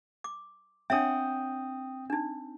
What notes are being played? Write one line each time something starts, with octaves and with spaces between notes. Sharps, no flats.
D6
C4 D4 C#5 E5 F#5 G5 D#6
D4 D#4